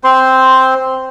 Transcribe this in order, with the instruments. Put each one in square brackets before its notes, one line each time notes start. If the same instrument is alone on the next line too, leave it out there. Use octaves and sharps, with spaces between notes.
[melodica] C4 C5 C6